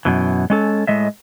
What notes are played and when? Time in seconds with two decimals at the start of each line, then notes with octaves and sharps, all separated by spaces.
0.05 F#2 B2 E3
0.50 G#3 C#4 A4
0.87 A2 G#3 D#5 E5